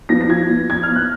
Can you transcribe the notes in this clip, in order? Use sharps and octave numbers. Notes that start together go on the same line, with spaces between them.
F3 B3 A#6
A#6
F3 G#6
B3
F3 G#6
F6
B3
F#6